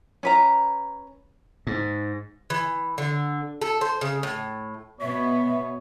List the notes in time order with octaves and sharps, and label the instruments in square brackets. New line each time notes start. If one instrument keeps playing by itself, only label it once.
[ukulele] C#4 B4 A#5
[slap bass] G#2
[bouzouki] E3
D3
A4
C5
C#3
A2
[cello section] B2 B3 [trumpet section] C#5 [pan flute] E5